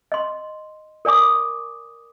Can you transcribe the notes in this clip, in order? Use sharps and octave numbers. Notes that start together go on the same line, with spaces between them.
D#5 C6
A#4 D5 G#5 D6 D#6